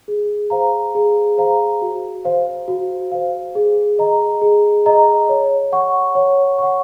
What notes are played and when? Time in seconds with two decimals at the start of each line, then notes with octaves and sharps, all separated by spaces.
0.08 G#4
0.50 C5 F5 A#5
0.95 G#4
1.38 C5 F5 A#5
1.82 F#4
2.25 C5 F5
2.68 F#4
3.12 C5 F5
3.55 G#4
3.99 D#5 A#5
4.42 G#4
4.86 D#5 A#5
5.29 C#5
5.72 F#5 C#6
6.15 C#5
6.58 F#5 C#6